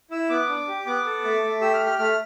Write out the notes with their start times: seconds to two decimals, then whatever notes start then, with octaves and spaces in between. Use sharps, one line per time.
0.11 E4 E6
0.30 B3 D6
0.49 D4
0.68 G4
0.86 B3 D6
1.05 A4
1.24 A3
1.43 A3
1.61 G4 E6
1.74 F6
1.80 G4
1.86 F6
1.99 A3 F6